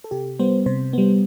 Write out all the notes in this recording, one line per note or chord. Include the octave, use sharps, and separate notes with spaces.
A4
C3 G4
G3 B3 C5
C3 C5
G3 B3